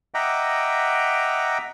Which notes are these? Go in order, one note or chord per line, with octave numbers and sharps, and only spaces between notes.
D#5 E5 F#5 G5 A#5 D6